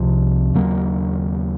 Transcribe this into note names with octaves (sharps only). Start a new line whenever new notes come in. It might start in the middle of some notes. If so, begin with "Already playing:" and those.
Already playing: C2 C3 F3
D#2 C#3 F#3 A#3